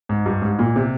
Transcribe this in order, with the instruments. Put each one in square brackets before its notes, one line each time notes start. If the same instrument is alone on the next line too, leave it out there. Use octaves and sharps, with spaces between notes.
[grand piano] G#2
G2
G#2
A#2
C3